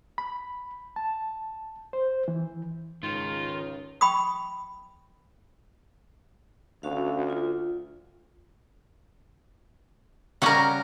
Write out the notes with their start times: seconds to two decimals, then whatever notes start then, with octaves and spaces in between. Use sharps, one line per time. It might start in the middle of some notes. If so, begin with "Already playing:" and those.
0.18 B5
0.96 A5
1.93 C5
2.28 E3
3.03 C#2 G#2 D#3 F4
4.01 G5 B5 C#6 D#6
6.83 D2 C#4 F#4 F5
7.30 F4
10.42 C#3 G3 C#4 A#4 F#5